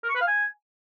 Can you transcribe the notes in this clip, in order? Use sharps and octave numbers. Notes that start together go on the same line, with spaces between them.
A#4
C#6
B4
F5
G#5